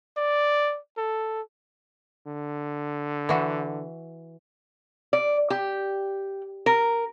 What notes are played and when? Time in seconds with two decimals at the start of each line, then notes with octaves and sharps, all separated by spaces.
0.17 D5
0.98 A4
2.27 D3
3.29 E3 F#4
5.13 D5
5.50 G4
6.66 A#4